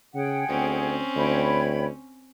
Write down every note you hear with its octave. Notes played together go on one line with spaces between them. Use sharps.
C#3 G#4 F#5 G5
D2 C4 C#4
D2 C#5 G5 B5